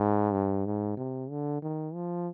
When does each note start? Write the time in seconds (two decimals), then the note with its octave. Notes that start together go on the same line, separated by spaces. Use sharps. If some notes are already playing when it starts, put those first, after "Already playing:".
Already playing: G#2
0.33 G2
0.66 G#2
0.97 C3
1.30 D3
1.62 D#3
1.94 F3